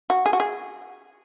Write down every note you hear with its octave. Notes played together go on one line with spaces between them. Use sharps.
F#4
G#4
F#4
G#4